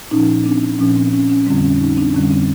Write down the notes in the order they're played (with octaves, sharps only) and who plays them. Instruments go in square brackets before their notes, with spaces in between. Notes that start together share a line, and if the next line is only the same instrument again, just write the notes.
[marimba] A#2 F3 C#4 D#4
C4 D4
A#2 F3 C#4
C4
C#4
C#4
F2 D3 G3 C4
C#4
C#4 D#4
C4 D4
F2 D3 G3 C#4
C4